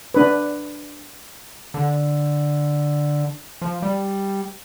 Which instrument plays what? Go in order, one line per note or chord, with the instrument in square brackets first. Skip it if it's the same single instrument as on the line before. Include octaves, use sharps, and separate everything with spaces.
[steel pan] D4 B4
[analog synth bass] D3
F3
G3